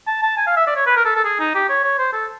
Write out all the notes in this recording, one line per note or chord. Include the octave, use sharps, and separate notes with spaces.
A5
A5
G#5
F5
E5
D5
C#5
B4
A#4
A4
A4
G#4
D#4
G4
C#5
C#5
C5
A4